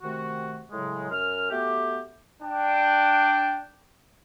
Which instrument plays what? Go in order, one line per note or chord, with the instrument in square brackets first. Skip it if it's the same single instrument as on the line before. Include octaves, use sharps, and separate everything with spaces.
[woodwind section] C3 D#3 A3 F#4
A2 C#3 F#3 G#3
F#2 A#4 F6
A3 B3 F#4 G4
[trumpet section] D4 G5